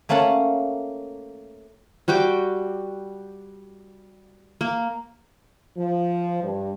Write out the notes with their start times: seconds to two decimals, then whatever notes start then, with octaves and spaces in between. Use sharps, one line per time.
0.09 A3 A#3 C#4 F#5 A5 A#5
2.08 G3 F#4 G5 D6
4.61 A#3
5.77 F3
6.43 G2